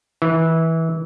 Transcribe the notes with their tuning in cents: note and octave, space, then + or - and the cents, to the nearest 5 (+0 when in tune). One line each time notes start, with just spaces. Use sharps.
E3 -20